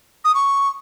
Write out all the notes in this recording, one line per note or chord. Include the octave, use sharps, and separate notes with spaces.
D#6
C#6